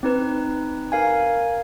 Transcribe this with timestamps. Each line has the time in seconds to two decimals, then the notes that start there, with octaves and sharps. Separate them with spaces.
0.03 C4 D#4 B4
0.92 A#4 F5 G#5